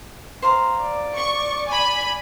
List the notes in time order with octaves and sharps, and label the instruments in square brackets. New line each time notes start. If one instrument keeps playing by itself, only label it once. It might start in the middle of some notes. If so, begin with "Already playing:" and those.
[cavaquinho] C5 F5 A#5
[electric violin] D5
[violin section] C#6
G#5 B5